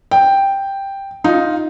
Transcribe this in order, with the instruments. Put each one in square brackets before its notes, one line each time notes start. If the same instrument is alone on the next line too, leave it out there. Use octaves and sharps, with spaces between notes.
[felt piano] G5
D#4 F4